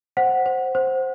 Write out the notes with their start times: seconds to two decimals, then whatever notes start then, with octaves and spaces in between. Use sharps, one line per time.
0.17 C5 F#5
0.46 C5
0.75 C5